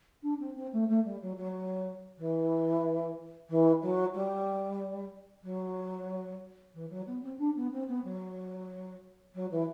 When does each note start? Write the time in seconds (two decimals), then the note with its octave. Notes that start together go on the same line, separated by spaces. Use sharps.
0.22 D4
0.39 C4
0.55 C4
0.72 A3
0.88 A3
1.04 G3
1.21 F#3
1.36 F#3
2.18 E3
3.49 E3
3.81 F#3
4.14 G3
5.43 F#3
6.74 E3
6.90 F#3
7.07 B3
7.22 C4
7.38 D4
7.56 B3
7.71 C4
7.88 B3
8.04 F#3
9.34 F#3
9.51 E3